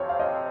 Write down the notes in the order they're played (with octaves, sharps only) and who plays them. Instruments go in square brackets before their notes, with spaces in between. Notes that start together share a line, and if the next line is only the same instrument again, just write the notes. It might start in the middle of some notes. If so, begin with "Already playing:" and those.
Already playing: [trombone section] F2 C3 F3 C4 [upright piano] C#5
[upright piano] F5
D#5